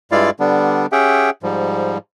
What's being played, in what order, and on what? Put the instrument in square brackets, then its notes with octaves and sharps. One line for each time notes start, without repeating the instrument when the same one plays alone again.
[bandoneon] G2 G#3 E4 F4 D5 F5
D3 G3 B3 D4
C#4 G4 G#4 E5 F#5 G5
G#2 F3 G3